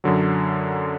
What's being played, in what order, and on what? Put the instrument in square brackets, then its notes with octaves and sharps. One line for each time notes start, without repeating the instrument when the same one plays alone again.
[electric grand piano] F#2 D3 F#3